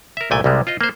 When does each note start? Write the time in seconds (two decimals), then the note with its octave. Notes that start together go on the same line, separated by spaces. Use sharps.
0.17 A#4 E5
0.31 C2 A#2 A3 G5 G#5
0.44 C2 C3 G3 G#3
0.67 F4 C5 D#5
0.81 A#3 C5